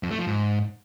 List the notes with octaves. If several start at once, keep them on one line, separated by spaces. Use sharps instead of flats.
F2
A3
F3
G#2